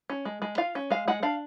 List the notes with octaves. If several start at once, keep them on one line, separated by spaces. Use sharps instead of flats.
C#4
G#3
G#3
F4 F5
C#4
G#3 F5
G#3 F#5
D4 F5